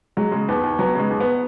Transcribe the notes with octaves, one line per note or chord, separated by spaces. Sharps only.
F#3 G#3
C#3 G#3
D#2 B3
D#2
F#3 B3
C#3 G#3
D#2
B3